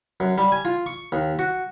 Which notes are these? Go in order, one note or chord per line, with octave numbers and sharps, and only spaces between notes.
F#2
G3
G#5
F4
C#6
D#2
F#4